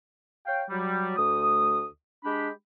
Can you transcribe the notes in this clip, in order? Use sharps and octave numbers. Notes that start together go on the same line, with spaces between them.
C#5 F5 G5
F#3 G3
D2 A3 D#6
G#3 D4 G4 B5